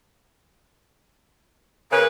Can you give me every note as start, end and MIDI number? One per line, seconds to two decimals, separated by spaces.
1.92 2.07 49
1.92 2.07 70
1.92 2.07 71